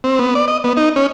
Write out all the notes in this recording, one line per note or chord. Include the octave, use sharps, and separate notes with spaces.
C4
B3
D5
D#5
B3
D#4
C#4